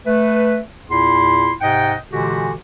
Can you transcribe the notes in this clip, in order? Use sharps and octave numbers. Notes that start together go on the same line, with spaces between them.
A3 B4
E2 A#2 E4 C6
G#2 C3 D#5 F#5 G5
A#2 D3 E3 G#3 F#4 G4